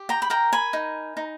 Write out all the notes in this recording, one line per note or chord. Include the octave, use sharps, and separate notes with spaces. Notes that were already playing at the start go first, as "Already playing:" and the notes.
Already playing: G4
G5 A#5
B5
A#4 G5 A#5
G#5 B5
D#4
D#4